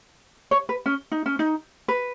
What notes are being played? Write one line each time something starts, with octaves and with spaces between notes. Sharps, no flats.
C#5
B4
C#4
D#4
C#4
D#4
B4